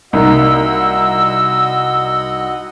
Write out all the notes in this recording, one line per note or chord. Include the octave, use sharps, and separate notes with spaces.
C2 A#3 D#4 F#4 D#5 F#5 E6